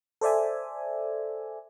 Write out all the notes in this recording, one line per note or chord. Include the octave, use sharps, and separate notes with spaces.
A4 C5 D5 E5 G#5